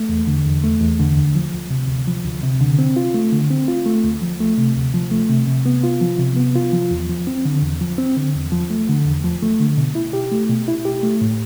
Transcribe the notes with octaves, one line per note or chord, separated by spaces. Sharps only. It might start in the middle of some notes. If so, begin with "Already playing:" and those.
Already playing: A3
E2
D3
E2
A3
E2
D3
D2
F3
D2
C3
D2
F3
D2
C3
D3
C4
F4
A3
D3
C4
F4
A3
D2
F3
A3
C3
D2
F3
A3
C3
C3
B3
F4
F3
C3
B3
F4
F3
E2
F3
C4
D3
E2
F3
C4
D3
E2
F3
A3
D3
E2
F3
A3
D3
B2
E4
G4
A3
B2
E4
G4
A3
A2